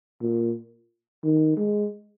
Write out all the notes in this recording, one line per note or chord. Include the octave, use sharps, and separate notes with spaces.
A#2
D#3
G#3